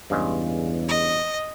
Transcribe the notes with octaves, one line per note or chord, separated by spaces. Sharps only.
E2 G2 C#3 G#3
D#5